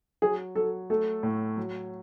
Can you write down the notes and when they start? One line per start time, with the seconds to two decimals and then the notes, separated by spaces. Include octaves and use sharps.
0.22 F#3 G#4
0.56 F#3 A4
0.90 A3 A4
1.23 A2
1.57 F#3